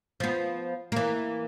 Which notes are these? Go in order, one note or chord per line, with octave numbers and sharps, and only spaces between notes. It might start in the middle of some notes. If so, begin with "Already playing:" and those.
F3 B3
E3 A#3